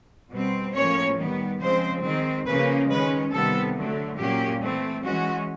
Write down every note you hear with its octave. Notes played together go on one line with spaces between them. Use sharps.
B2 G3 C4
A2 F3 A#3 C#4 C#5
D#3 G3 B3
C#3 F3 G#3 C4 C5
D#3 G#3 C4
C#3 F3 A#3 C#4 B4
D#3 G#3 C#4 B4
C3 D#3 G3 B3 A4
D3 F#3 A3
A#2 F#3 A#3 C#4 G4
E3 A3 C4
E3 G#3 C#4 F#4